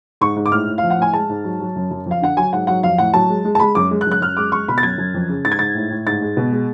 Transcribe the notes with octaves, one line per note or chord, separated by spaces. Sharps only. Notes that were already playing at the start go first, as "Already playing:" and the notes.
G#2 C#6
G#2
D6
A2 F6
A2
F5
F3
F#5
A2 G#5
G#3 A5
G#2
F#3
F#3
F#2
F#2
F2
F5
D3 F#5
F#3 G#5
G#2 F#5
F#3 F#5
F2 F5
A2 F#5
F#3 A5
G#3
G#3
A5
G#3 B5
F#2 D6
G#3
F#6
F#2
F#6
F#2 F6
G#3 D6
G#3 C#6
B2 B5
A6
F#2 G#6
F#2
F2
C#3
G#2 A6
G#6
G#2 A6
A2
A2
G#2 A6
G#3
B2
G#3